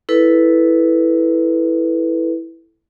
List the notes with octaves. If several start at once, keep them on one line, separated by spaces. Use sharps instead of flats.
E4 A4 B4